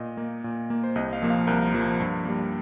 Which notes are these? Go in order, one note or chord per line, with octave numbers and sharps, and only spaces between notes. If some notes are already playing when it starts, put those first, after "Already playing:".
Already playing: A#2 D#5
A#3
A#2
A#3
C5
C2 D#5
F5
A#2 F3 A#3
F5
C2 A#4
A#2 F3 A#3
G2
G3 A#3